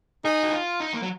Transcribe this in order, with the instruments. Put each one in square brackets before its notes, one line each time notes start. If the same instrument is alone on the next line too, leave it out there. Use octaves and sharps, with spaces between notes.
[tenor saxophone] D#4 [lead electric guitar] G#4
[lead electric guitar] F#4
F4
D#4
A#3
F#3